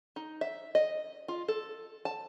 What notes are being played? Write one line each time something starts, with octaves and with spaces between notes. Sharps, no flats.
D#4
E5
D#5
F4
A4
A5